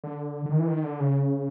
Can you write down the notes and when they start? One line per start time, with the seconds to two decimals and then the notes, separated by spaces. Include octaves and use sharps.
0.04 D3
0.46 D3
0.51 D#3
0.60 E3
0.68 D#3
0.84 D3
1.00 C#3